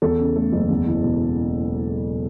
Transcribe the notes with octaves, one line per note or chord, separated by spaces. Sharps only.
E2 A4
C#3
A3
F#1
E2
E3
E1